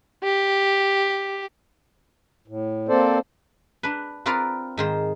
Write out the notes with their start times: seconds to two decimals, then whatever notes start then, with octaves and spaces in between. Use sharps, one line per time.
0.24 G4
2.48 A2
2.89 A#3 C4 A4 C5 D5
3.83 D4 B4
4.26 C4 F4 A#4 B4 D5 F5
4.77 G#2 D#3 C5